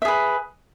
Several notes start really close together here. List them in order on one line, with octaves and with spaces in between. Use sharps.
E5 G#4 B4